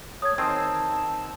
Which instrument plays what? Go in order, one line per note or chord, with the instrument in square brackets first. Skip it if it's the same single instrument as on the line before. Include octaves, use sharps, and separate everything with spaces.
[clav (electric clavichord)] A3 [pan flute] C#5 [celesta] D#6 G#6
[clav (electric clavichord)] D#3 C4 G#4 [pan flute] A5 [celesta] E6